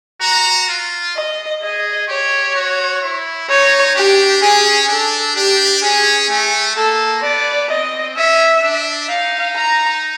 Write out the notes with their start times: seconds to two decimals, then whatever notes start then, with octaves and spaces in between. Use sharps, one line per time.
0.21 F#4 A#5
0.69 F4
1.16 D#5
1.62 G#4 D#5
2.08 G4 C#5
2.55 F#4
3.02 E4
3.49 D#4 C#5
3.96 D4 G4
4.42 C#4 G#4
4.89 D4 A4
5.35 D4 G4
5.82 C#4 G#4
6.29 A3
6.76 A#3 A4
7.22 B3 D5
7.69 C4 D#5
8.16 C#4 E5
8.62 D4
9.09 D#4 F5
9.56 A#5